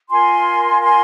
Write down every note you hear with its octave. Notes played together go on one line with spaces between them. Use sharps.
F4 A#4 G#5 C6
G#5 C6